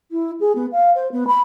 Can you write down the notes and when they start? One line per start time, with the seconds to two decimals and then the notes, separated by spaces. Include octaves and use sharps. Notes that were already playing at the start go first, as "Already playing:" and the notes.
0.11 E4
0.40 G#4
0.55 B3
0.72 F5
0.95 C5
1.12 B3
1.27 B5